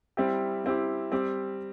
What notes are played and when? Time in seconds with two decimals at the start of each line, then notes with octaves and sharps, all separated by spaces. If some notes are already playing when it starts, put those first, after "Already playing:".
0.17 G3 C4 E4 G4
0.64 G3 C4 E4 G4
1.12 G3 C4 G4